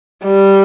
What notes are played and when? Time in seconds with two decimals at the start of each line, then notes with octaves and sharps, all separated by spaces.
0.24 G3